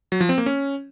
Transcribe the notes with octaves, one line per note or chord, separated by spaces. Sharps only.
F#3
F3
C4
A#3
C#4